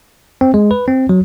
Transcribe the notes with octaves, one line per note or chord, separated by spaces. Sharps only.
C4
G#3
B4
C4
F#3